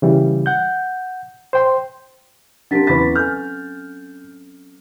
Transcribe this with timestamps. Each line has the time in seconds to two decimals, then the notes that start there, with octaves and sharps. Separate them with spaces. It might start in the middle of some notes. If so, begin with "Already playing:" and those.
0.02 C#3 E3 G3
0.46 F#5 G6
1.53 C5 G5 C6
2.71 F#3 C4 D4 G4 A#4 A6 B6
2.87 E2 C#4 B4 B5 D6 A6 B6
3.16 A4 G#5 F6 G6